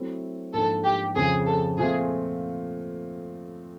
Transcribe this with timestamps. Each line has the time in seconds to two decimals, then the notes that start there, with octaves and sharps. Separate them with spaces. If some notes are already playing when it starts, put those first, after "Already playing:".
Already playing: F#3 A3 C4 E4
0.53 G#2 F3 A#3 D4 A4
0.84 G4
1.15 F2 C#3 F3 G#4
1.46 A4
1.78 A#2 F3 A3 C4 F4 G#4